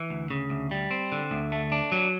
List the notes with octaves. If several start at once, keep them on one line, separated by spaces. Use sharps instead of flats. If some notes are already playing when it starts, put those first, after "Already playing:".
Already playing: E3
D2
C#3
D2
G3
C4
D3
D2
A3
D4
F#3